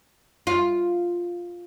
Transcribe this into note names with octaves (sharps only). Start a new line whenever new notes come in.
F4